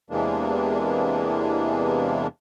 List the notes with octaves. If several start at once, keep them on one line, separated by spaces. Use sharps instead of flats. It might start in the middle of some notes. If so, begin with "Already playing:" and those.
E2 C3 E3 G#3 A#3 D4